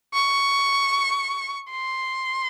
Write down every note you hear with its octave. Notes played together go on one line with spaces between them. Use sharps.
C#6
C6